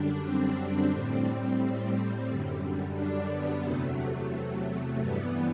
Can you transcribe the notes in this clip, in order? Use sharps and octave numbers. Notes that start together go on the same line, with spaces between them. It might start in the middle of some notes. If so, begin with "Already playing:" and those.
Already playing: F#2 D3 G3 D4
C4
A2 G3
F#2 D3 G3
D4
B3
E2 C3 F#3 A3
G2 E3 G3 B3